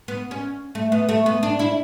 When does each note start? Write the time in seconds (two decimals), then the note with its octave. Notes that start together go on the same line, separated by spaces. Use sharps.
0.08 B3
0.31 C#4
0.75 A3
0.92 B3
1.09 A3
1.26 B3
1.43 D4
1.59 E4